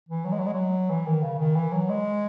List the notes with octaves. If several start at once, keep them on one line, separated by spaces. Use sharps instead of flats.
E3
F#3
G#3
F#3
G#3
F#3
E3
D#3
C#3
D#3
E3
F#3
G#3